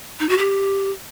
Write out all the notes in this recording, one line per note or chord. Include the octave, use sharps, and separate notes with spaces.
D#4
F#4
G4